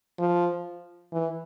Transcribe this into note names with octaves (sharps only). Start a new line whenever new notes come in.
F3
E3